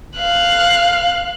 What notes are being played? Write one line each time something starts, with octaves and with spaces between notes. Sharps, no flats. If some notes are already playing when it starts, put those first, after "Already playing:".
F5 F#6